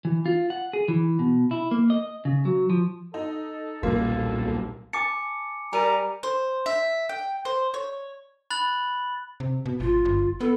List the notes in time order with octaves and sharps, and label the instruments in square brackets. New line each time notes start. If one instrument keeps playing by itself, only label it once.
[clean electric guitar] E3
F4
F#5
G#4
E3
B2
E4
A#3
D#5
C#3
F#3
F3
[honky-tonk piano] D#4 [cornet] A4
[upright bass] D#1 [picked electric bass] B1 A#2 G3 [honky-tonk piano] A#3 [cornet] A4
[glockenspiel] G#5 D6 C#7 [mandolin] A5
[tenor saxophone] G3 [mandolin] A#4 [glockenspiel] G#5 D#7 [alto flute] A#5
[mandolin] C5
E5
G5
C5
C#5
[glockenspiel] B5 F#6 A6 F#7
[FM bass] C3
B2
[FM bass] G#1 [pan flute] F4
[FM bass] G1
[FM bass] B3 [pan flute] A4